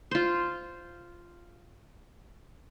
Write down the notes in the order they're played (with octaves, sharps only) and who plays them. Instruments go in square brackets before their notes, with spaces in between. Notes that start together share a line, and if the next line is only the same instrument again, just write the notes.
[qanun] F4 C5